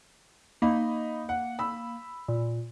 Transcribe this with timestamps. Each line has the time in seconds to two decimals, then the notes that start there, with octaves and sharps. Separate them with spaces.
0.62 A#3 D#4 D#5 B5
1.29 F#5
1.59 B5 E6
2.28 A#2